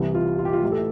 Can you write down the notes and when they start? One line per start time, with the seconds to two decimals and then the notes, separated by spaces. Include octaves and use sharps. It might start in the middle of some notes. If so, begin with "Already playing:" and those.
Already playing: C2 C3 E3
0.14 F4
0.38 F4
0.45 G4
0.53 F4
0.63 A1 A2 E3 G4
0.72 A4